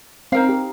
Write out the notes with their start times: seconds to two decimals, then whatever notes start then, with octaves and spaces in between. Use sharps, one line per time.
0.32 C4 D#4 A#4 F5
0.49 G4